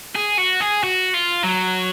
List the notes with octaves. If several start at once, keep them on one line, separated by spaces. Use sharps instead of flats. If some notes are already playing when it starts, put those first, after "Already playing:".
G#4
F#4
G#4
F#4
F4
F#3